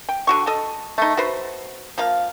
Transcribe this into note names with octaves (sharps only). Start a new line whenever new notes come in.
G5
D3 F#4 C#6
A4 D#5
A3 D#4
F#4 B4 C5
F3 A#3 F5